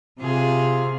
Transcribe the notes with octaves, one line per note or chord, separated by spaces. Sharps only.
C3 F4 G#4